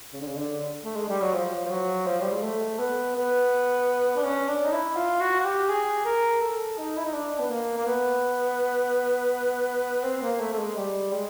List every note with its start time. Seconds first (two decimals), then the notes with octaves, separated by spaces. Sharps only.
0.13 C#3
0.21 D3
0.28 C#3
0.37 D3
0.84 A3
0.96 G#3
1.09 G3
1.21 F#3
1.34 F3
1.65 F3
1.70 F#3
2.07 F3
2.21 G3
2.32 G#3
2.43 A3
2.79 B3
3.16 B3
4.16 D4
4.24 C#4
4.48 D4
4.66 D#4
4.72 E4
4.96 F4
5.21 F#4
5.40 F#4
5.44 G4
5.69 G#4
6.05 A#4
6.41 A4
6.78 D#4
6.97 E4
7.05 D#4
7.14 D4
7.39 B3
7.50 A#3
7.77 A#3
7.87 B3
10.04 C4
10.22 A#3
10.40 A3
10.53 A3
10.59 G#3
10.77 G3
11.12 G#3